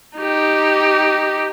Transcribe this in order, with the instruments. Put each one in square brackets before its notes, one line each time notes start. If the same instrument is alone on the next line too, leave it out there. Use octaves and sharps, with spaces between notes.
[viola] D#4 G4